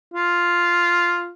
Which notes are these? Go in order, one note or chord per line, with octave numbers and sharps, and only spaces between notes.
F4